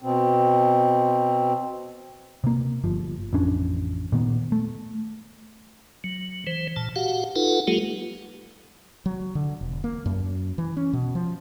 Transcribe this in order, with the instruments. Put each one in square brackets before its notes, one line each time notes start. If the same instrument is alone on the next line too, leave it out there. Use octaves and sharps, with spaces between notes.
[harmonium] B2 C4
[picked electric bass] C3 A#3
G1 F3
A1 F2 C#4 D4
A#2 D#3 B3
A3
[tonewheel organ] F#3
E3 C5
A#2 A5
F#4 G4 F5 F#5
D#4 F4 A4 B4 F#5
F#3 G#3 A#3 F4 G4 A4
[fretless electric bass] F#3
D3
E1
A#3
F#2
E3
C#4
B2
F3